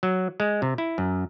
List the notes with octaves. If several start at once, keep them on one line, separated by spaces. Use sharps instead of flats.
F#3
G#3
C3
E4
F#2